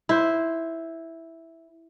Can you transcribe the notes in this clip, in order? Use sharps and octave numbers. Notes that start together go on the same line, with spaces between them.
E4 C5